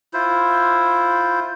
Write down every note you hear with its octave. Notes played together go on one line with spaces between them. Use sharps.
E4 F4 C5